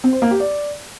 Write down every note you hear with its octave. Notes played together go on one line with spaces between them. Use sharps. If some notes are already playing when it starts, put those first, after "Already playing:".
C4
C5
A#3
G4
D5